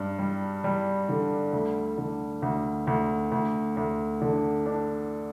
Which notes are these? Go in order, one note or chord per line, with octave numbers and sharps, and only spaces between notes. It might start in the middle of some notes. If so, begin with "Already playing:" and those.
Already playing: G2
G3
G3
D3
D2
D3
D2
D2
D2
D2
D3
D4